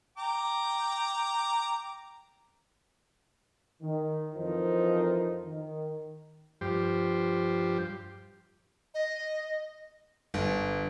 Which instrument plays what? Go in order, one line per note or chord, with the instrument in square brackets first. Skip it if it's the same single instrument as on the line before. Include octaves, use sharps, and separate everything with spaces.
[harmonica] G5 A#5 D6
[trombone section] D#3
F2 E3 F3 D#4 A#4 C5
D#3
[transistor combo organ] G2 F3 G4 C5
[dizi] D#5
[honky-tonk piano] G1